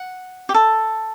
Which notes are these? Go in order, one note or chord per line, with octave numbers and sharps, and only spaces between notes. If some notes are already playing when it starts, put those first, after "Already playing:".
Already playing: F#5
G4
A4